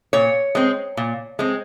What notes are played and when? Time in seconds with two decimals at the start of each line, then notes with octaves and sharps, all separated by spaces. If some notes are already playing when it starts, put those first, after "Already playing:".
0.13 A#2 C#5
0.55 G#3 C4
0.97 A#2
1.39 G#3 C4